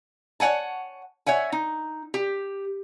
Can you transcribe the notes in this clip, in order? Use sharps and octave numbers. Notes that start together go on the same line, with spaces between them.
C#5 D5 F#5 G#5 A5
C#5 E5 F#5 G#5
D#4
G4